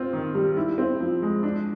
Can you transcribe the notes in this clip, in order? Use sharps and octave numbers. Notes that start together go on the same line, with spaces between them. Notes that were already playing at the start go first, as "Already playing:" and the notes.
Already playing: C4 F4
D#3
G3
E4
C4
F3
G#3
D4